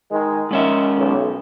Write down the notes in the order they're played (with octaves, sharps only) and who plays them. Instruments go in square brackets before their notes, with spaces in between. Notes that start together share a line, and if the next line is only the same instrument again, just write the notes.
[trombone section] D#3 G#3
[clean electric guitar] G#2 C#4 E5 [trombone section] D#3
[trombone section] B1